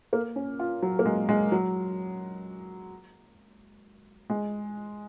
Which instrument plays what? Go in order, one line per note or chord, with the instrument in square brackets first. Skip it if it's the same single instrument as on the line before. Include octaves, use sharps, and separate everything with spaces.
[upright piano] A#3
C#4
F4
F#3
A#3
G#3
G#3
F#3
G#3